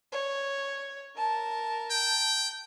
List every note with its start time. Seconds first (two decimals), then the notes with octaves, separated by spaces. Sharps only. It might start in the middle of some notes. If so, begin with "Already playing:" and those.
0.12 C#5
1.16 A#4 A5
1.91 G5